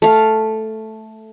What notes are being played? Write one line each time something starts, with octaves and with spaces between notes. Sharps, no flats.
A3 F5